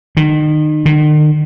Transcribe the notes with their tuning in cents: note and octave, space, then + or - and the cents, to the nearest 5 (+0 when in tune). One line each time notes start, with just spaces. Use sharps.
D#3 -30
D#3 -45